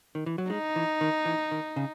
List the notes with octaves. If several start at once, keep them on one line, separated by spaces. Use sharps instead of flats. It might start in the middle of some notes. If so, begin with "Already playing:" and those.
D#3
E3
F#3
G#3 D#4
E3
D#3
E3
D#3
C#3